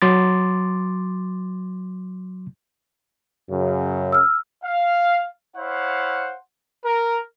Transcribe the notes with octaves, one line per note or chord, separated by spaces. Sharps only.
F#3 C6 D6 A6
F#2 C#3
E6 F6
F5
E4 C5 C#5 F5 F#5
A#4